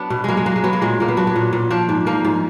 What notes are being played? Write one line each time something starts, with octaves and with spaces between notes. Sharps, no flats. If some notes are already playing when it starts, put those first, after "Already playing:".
Already playing: F#3 B3 D4
B2
F#3 G#3 A#3
G#3
F#3 A#3
G#3
F#3 B3
A#3
A#2 G#3
A#2 A#3
B3
F#3 D4
B3
A#2
A#2
F3 D4
G#2
F3 A#3
G#2